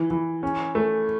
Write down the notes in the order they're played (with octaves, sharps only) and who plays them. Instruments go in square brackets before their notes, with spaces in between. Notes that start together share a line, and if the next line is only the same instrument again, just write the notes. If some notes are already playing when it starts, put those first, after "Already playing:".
Already playing: [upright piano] E3
E3
C#4
A3